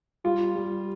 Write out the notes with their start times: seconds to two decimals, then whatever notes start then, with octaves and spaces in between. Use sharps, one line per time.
0.24 G3 F4
0.56 G3